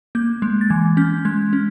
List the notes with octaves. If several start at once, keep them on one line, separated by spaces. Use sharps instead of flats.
A#3 G6
G#3
A6
E3 G#6
C#4 G6
G#3 G#6
C#4